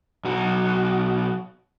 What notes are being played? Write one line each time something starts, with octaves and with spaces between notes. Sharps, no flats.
B1 F#4